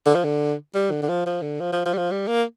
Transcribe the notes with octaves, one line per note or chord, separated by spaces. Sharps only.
D3
F3
D3
G3
D3
D3
F3
F3
D3
F3
F3
F3
G3
F3
G3
A#3